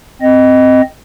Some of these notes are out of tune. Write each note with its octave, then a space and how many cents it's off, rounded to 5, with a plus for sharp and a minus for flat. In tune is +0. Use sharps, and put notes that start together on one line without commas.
C4 -5 D#5 +0